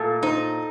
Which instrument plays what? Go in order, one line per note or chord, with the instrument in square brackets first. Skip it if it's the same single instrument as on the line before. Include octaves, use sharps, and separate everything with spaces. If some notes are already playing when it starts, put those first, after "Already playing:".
Already playing: [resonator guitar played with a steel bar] A#2 A3 [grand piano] A4
[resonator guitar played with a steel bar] D#4 [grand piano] C5